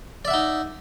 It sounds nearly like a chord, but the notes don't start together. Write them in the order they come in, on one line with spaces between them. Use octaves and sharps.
D5 E5 F#5 D#4